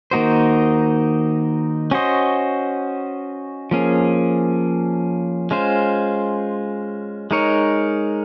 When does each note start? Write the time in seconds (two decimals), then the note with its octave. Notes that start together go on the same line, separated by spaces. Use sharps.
0.11 D#3 A#3 D#4 F#4 C5
1.91 C#4 F#4 C5 D#5
3.71 F3 A#3 C#4 G#4
5.51 G#3 C#4 F4 C5
7.31 G#3 D#4 A#4 C#5